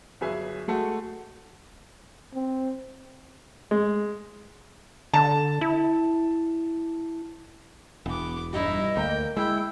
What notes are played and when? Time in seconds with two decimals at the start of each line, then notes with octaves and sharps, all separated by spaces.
0.21 G1 F#3 G#4 B4 E5 G#5
0.68 G#3 A3 F#4 A4
2.34 C4
3.71 G#3
5.14 D3 A5
5.61 E4
8.06 E1 B3 D6
8.53 G2 D#4 E4 D#5
8.97 D2 A#3 G5
9.36 G#3 E4 G5 E6